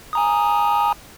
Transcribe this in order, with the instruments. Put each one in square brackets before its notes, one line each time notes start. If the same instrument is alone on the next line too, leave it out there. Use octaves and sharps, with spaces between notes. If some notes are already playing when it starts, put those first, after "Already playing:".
[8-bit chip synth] G#5 A#5 D#6